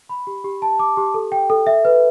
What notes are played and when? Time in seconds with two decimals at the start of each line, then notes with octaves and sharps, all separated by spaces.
0.09 B5
0.27 G4
0.44 G4
0.62 A5
0.79 D6
0.97 G4
1.14 A4
1.32 G5
1.50 A4
1.67 E5
1.85 B4